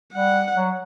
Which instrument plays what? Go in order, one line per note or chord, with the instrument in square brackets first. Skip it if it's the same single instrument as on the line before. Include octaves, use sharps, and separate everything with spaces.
[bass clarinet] G3 [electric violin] F#5
[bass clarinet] F#3